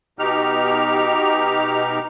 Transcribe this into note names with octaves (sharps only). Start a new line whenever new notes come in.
B2 D#4 G4 F6